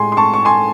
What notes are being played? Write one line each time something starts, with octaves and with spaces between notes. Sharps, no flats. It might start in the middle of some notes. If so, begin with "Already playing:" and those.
Already playing: A2 G#3 G#5 C6
C6
A5 C#6
C#6
G#5 C6